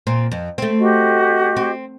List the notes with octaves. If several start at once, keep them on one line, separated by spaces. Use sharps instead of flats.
A#2 C4
F2
A3 C4
F#4 G4 D#5
C4